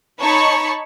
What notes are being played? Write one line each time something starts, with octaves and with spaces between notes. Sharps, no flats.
D#4 C#5 A5 B5 C#6